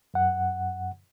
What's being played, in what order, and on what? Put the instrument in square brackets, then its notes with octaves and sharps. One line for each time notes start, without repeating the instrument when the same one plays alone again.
[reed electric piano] F#2 F#5